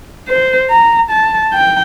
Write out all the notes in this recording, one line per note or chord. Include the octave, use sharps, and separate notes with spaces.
C5
A#5
A5
G5